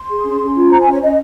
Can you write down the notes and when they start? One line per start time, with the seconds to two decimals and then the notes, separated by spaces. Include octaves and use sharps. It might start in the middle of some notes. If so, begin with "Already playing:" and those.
Already playing: C6
0.09 G#4
0.24 C#4
0.40 C#4
0.56 F4
0.70 C5 A#5
0.81 G#5
0.86 C#4
0.91 C#5
1.01 C#4 D#5